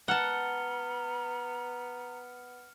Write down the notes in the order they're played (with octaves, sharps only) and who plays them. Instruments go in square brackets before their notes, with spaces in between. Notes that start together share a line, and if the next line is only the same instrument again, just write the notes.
[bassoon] B3 [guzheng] F#5 A5 [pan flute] A#5 [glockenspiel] F6 C#7 G7